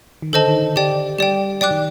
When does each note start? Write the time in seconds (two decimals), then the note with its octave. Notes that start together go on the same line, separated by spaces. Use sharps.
0.22 D#3
0.33 D3 A4 C5 D#5 A5
0.48 D#3
0.62 D3
0.76 D3 G4 D5 G5
1.19 G3 G4 D5 G5
1.61 F#3 D5 G5 D6 F#6
1.71 D#3